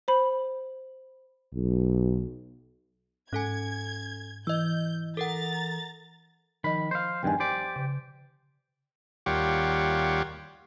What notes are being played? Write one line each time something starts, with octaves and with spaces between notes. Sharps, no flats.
C5 B5
B1
G#2 C#4 A4 G#5 G#6
E3 D#5 E6 G6
A4 A#4 F#5 A#5 A6
D#3 F3 D#5 B5
C5 F5
E2 G2 D#3 G5 G#5
G4 C5 D5
C#3
D#2 G3 F4 G4 C#5 F#5